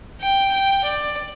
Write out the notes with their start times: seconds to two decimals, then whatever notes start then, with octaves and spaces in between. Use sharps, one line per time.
0.21 G5
0.53 G5
0.84 D5